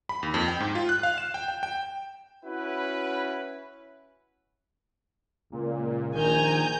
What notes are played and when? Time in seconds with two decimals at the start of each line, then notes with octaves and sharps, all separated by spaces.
0.09 B5
0.23 D#2
0.34 F2
0.48 G5
0.60 G#2
0.75 F4
0.89 F#6
1.03 F5
1.18 E7
1.34 G5
1.48 G5
1.63 G5
2.44 C#4 E4 F#4 B4
5.52 C#2 A#2
6.15 A#1 D#3 G#5 A#5 G6